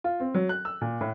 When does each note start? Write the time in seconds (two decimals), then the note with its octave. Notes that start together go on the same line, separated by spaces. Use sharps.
0.04 F4
0.20 C4
0.34 F#3
0.49 F#6
0.65 E6
0.81 A#2
1.01 A2